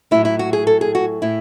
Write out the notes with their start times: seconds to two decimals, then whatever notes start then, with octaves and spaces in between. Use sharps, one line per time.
0.11 A2 F#3 E4
0.25 E4
0.39 F#4
0.53 G#4
0.67 A4
0.81 G#4
0.95 F#4
1.22 A2 E4